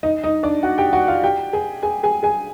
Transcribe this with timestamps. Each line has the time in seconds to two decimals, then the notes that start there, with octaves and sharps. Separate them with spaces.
0.03 D#4 D#5
0.23 D#4 D#5
0.43 D4 D5
0.63 F#4 F#5
0.78 G4 G5
0.93 F#4 F#5
1.08 F4 F5
1.24 G4 G5
1.53 G#4 G#5
1.83 G#4 G#5
2.03 G#4 G#5
2.23 G#4 G#5